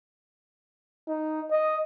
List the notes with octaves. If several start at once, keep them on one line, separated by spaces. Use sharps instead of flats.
D#4
D#5